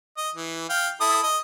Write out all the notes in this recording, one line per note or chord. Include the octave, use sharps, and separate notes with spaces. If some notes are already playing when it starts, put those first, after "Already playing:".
D#5
E3
F5 G5
E4 A4 D#6
D#5